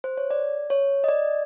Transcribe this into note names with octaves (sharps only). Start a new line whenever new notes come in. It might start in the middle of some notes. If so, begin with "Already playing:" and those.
C5
C#5
D5
C#5
D#5
D5